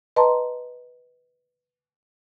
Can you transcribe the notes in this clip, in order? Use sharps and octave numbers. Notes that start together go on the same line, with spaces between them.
B4 D#5 A5 A#5 C6